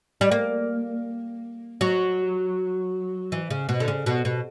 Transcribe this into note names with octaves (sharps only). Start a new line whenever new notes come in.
G3
A#3
F#3
E3
C#3
B2
D3
C#3
B2
B2